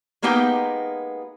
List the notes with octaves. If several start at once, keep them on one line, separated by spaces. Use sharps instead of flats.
G#3 A#3 B3 D#4 G4 G5